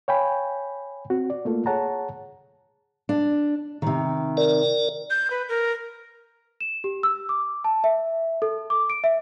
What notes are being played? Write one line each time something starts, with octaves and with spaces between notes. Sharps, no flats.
C#5 F5 G5 G#5 B5
C4 F#4
D5
A3 A#3 F4 A4
G#4 C#5 F#5 A5 A#5
D4
C3 D#3
A#4 D5
G6
B4
A#4
E7
G4
E6
D6
A5
E5
A4
D6
D7
E5